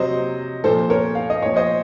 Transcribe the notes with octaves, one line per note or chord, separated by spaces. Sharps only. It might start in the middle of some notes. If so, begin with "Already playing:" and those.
Already playing: C3 F#3 C5 D#5
A#2 F3 A4 C5
A#4 C#5
F5
D#5
A#2 F3 C#5
C5 D#5